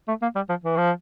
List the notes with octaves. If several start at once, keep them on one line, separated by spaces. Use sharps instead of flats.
A3
A#3
G3
F3
E3
F3